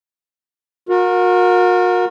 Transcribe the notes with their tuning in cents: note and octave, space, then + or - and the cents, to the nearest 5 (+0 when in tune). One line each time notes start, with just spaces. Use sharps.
F#4 -40 A#4 +0